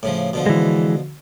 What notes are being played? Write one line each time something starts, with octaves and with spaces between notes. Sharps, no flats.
A2 C#3 F3
B2 D3 F3
E3 G#3